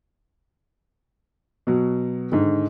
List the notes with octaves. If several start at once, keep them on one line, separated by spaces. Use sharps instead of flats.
B2 F#3
G#2 D3 D#3